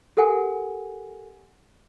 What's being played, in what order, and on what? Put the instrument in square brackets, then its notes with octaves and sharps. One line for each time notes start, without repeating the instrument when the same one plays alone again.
[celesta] G4 A4 A#4 F#5 G#5